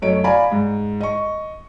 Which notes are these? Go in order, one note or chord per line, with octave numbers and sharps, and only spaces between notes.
F#2 A3 C#5 D#5 D7
D5 F5 G#5 A#5 B5
G#2
D#5 C#6